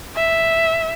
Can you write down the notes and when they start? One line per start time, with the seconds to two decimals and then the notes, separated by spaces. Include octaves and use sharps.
0.16 E5